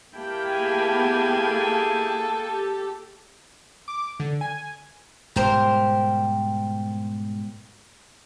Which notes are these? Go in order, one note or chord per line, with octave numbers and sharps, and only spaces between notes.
A#3 E4 G4 G5 A5
G#4 G#5
B3
A4
G4
D6
D3
G#5
G#2 B2 G3 G4 A#4 C5